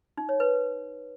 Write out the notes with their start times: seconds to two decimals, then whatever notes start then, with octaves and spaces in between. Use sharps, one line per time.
0.17 D#4
0.29 C#5
0.40 B4